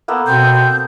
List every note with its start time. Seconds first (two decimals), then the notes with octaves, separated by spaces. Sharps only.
0.08 A#3 B3 A4
0.27 B2 C4 G6